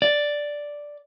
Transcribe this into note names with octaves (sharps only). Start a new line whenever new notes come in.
D5